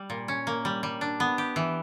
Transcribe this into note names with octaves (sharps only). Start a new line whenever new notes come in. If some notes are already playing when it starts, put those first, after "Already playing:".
Already playing: G3
A#2
C#4
A#3
G3
G3
D4
B3
G4
E3